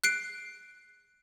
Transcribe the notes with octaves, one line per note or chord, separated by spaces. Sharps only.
F#6 C7 D7